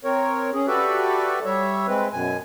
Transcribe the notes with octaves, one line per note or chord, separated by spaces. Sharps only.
C4 A#4 C#5
C#4 G#4
F#4 G4 A4 B4 D5 E5
G3 C#5 E5
G#3 C4 B4
F#2 B2 G#5